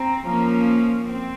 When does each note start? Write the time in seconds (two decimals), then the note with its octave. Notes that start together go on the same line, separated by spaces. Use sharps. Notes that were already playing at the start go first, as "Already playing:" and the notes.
Already playing: C4 A#5
0.25 F3 A#3 C#4
1.06 C4